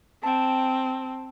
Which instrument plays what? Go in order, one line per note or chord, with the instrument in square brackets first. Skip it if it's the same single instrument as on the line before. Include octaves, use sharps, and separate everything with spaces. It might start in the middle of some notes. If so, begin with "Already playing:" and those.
[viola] C4 [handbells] G5 A5